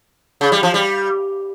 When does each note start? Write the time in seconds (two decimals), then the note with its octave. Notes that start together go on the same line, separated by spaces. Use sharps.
0.41 C#3
0.52 G3
0.63 F3
0.74 G3